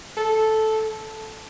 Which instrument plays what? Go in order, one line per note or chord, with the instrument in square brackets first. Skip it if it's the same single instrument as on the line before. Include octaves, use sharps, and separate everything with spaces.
[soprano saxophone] A4